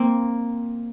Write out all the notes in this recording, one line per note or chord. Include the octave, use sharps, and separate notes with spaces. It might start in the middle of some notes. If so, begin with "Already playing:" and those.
Already playing: A#3 C4